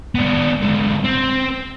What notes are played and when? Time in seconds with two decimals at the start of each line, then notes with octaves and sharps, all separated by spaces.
0.15 B3 D4
0.61 G#2 D3
1.04 C4